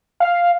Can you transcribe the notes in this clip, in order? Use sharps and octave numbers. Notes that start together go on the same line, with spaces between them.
F5